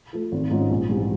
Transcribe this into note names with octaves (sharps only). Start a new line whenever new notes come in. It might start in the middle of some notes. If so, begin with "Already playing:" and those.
F3 A3
G#1
G#2 F3 G#3 C#4
A#1
G#2 E3 G3 C4